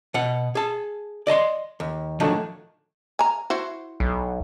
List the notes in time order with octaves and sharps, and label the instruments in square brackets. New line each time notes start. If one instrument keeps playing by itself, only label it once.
[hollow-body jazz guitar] B2 F#5
G#4 A5
D5 D#5 A5 C6
D#2
D3 D#3 F3 F#3 A3 D4
[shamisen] G#5 A#5
E4 F#4 C5
[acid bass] B1